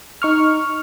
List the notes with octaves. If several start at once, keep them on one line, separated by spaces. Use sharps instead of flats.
D#4 C#6 F6